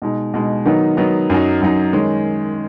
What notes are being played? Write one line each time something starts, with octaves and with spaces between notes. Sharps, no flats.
B2 G#3 D#4
B2 G#3 D#4
D#3 F#3 B3 D#4
D#3 F#3 B3 D#4
F#2 F#3 D#4
F#2 F#3 D#4
D#3 G#3 C#4